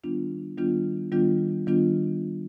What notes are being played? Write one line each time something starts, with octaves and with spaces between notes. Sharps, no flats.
D#3 G3 B3 D4 F4
D#3 G3 B3 D4 F4
D#3 G3 B3 D4 F4
D#3 G3 B3 D4 F4